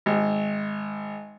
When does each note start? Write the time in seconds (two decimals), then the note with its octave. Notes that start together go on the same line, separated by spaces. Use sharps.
0.06 G#1